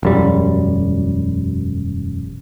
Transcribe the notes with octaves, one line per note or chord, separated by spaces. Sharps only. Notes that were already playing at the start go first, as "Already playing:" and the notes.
E1 F#2 G3